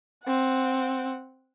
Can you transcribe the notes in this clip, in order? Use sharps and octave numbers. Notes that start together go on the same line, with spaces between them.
C4 F#5